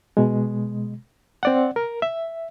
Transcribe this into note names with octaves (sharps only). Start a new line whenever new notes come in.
B2 G#3
C4 D5 F#5
A#4
E5